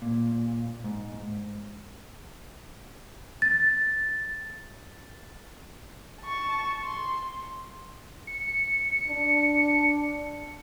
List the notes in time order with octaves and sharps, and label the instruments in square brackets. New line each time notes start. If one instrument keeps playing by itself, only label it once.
[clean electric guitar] A#2
G#2
[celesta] A6
[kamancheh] A5 C#6
C6
[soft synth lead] C#7
[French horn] D4